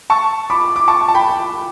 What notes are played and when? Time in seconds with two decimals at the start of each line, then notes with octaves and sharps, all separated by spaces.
0.10 A5 C#6
0.50 B5 D6
0.76 D6
0.88 A5 C#6
1.08 A5
1.15 G5 B5